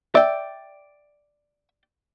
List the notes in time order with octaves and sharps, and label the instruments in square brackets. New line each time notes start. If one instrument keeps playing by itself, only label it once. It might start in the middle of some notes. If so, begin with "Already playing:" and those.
[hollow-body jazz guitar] D5 G5 [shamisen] E5